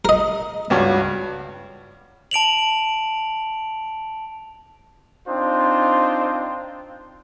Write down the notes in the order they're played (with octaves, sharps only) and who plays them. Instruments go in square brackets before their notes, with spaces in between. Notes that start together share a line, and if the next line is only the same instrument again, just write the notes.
[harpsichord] A#4 D#5
[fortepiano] C#2 G2 F#4
[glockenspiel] A5 D7 F7 F#7
[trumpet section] C4 D4 D#4 F4 C5